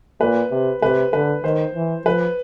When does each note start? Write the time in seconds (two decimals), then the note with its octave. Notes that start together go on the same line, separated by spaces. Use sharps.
0.20 A#2 B4
0.51 C3
0.82 C3 B4
1.13 D3 B4
1.43 D#3 C5
1.75 E3
2.05 F3 B4